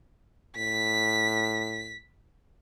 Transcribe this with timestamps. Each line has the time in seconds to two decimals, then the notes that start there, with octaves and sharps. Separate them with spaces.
0.56 A2 B6